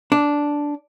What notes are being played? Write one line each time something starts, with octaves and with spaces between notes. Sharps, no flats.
D4